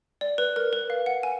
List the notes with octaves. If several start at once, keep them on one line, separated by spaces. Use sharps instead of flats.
D5
B4
A#4
B4
F5
F#5
G#5